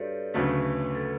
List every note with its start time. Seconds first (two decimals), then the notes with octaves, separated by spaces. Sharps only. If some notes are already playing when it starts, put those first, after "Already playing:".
Already playing: G2 F#4 G4 A4 B4 C#5 D5
0.34 D2 C#3 F#3 A3 B4
0.95 A4